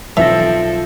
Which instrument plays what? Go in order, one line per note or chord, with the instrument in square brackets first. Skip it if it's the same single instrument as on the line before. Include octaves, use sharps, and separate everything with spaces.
[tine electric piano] B1 A#6 [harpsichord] E3 [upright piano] F3 E5 [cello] C4 A4